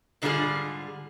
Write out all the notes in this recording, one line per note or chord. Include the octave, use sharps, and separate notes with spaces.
G#2 D3 G3 B3 F4 G#4